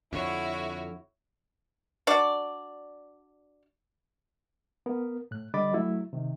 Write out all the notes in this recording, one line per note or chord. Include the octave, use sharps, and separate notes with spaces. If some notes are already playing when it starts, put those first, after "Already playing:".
F2 D3 E4 F#4 C#5
D4 F#4 D5
B3 A#4
A2 F#6
D3 G3 D#5 B5 D6 A6
F#3 A3 E4
C3 D#3